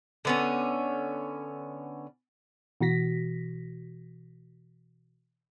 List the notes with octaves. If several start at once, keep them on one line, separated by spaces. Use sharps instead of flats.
D3 B3 C#4
B2 E3 F#4 A#6 B6